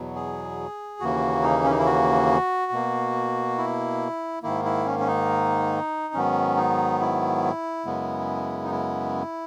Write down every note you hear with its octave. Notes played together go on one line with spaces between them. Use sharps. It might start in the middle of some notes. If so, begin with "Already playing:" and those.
Already playing: E2 B2 F#3
G#4
D#2 C#3 E3 A#3 F#4
D#4
C#4
D#4
E4
F#4
B2 A#3
E4
G#2 D#3 A#3 E4
E4
C#4
C#4
D#4
G#2 D#3 F#3 B3 C#4
D#4
E4
F#2 C#3 G#3 B3
D#4
E4